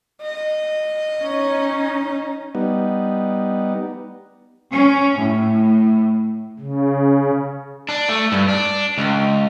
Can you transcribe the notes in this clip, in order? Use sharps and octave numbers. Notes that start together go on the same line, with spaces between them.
D#5
C#4 D#4
G3 B3 D#4
C#4
A2
C#3
D4
A3
G2
D4
C#2